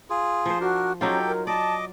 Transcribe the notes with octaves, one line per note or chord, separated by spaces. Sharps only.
F4 G#4
F3 C5
D4 F#4 A#4
F#3 C#4 D#4 F4 G4 A4 G5
A#4
D5 D#5 A5 D6